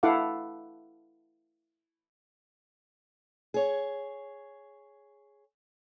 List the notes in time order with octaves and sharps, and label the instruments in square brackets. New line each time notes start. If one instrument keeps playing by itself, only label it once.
[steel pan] E4 A4 F5 F#5 D6
[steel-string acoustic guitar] G#4 C#5